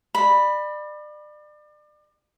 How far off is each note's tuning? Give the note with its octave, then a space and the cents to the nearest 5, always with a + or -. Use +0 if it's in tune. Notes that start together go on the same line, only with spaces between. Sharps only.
D5 +35 B5 -5